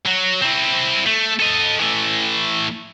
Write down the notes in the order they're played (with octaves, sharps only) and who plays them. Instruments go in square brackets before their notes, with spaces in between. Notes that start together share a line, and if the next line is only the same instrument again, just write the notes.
[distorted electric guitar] F#3
C4 E4
A3
A4 D#5
E3 A3